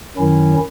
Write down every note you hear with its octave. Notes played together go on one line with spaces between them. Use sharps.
F#2 D#3 F#3 C#4 E4